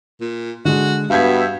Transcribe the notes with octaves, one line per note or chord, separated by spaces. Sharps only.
A#2
D3 G#3 F#4
G2 B3 F#4 E5 F5 G6 G#6